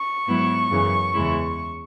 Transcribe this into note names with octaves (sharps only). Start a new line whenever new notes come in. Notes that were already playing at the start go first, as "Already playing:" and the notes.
Already playing: C#6
G#2 F#3 B3 E4
F#2 C#3 E3
E2 C#3 G#3 E4